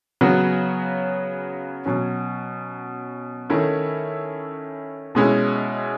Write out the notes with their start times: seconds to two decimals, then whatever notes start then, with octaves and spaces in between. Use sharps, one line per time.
0.21 C#3 F#3 B3 F#4
1.85 B2 F#3 C#4
3.50 D#3 A3 C#4 E4
5.15 B2 G#3 C#4 E4